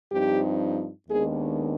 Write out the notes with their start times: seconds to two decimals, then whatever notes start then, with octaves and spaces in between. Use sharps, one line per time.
0.12 G2 F3 C4 D#4 G4
1.08 D#2 D#3 G#3 B3 D4 G#4